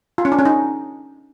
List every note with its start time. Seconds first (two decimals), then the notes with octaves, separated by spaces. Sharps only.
0.18 F4
0.25 C#4
0.32 D4
0.39 C#4
0.45 D#4